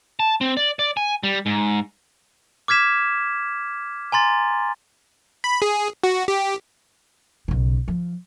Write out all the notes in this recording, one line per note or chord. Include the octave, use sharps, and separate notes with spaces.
A5
C4
D5
D5
G#5
G3
G#2
D6 F6 G#6 B6 E7
G#5 A#5 C6 A6
B5
G#4
F#4
G4
B1 C#3
F3